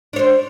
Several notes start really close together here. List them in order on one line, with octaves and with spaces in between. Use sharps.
D4 C#5 C5